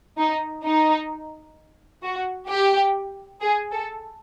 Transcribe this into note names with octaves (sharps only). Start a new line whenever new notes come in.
D#4
D#4
F#4
G4
G#4
A4